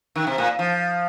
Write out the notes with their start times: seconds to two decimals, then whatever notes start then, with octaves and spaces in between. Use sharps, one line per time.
0.16 D#3
0.27 C3
0.38 A#2
0.59 F3